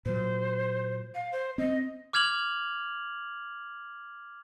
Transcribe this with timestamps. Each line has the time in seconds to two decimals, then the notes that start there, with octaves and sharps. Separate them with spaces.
0.06 A#2 F#3 C5
1.14 F5
1.32 C5
1.58 C4 D#5
2.13 D6 F6 G#6 F7 F#7